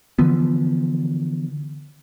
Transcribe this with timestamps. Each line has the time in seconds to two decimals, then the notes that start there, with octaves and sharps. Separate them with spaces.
0.19 D3 E3 F3 B3